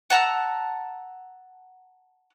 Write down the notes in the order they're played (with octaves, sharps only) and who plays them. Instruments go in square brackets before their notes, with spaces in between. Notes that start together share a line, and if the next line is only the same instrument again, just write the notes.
[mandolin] F#5 A5 A#5 E6